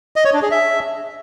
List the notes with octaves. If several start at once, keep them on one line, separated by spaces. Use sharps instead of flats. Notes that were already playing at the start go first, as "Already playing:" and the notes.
D#5
C#5
D4
G#4
E5